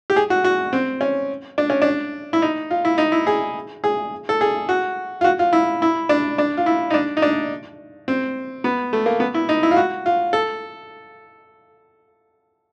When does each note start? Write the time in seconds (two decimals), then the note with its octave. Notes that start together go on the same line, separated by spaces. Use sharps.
0.10 G4
0.16 G#4
0.30 F#4
0.44 F#4
0.73 C4
1.01 C#4
1.58 D4
1.70 C#4
1.82 D4
2.33 E4
2.42 D#4
2.71 F4
2.85 E4
2.98 D#4
3.12 E4
3.27 G#4
3.84 G#4
4.29 A4
4.41 G#4
4.69 F#4
5.21 F4
5.24 F#4
5.39 F4
5.53 E4
5.82 E4
6.09 D4
6.38 D4
6.57 F4
6.66 E4
6.90 D#4
6.94 D4
7.17 D#4
7.22 D4
8.08 C4
8.64 B3
8.93 A3
9.06 A#3
9.20 B3
9.34 E4
9.49 D#4
9.63 E4
9.71 F4
9.76 F#4
10.06 F4
10.33 A4